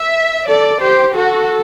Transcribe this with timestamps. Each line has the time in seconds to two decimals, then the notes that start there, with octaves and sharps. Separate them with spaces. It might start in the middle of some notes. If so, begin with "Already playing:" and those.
Already playing: E5
0.48 A4 D5
0.81 G4 C5
1.16 F#4 A4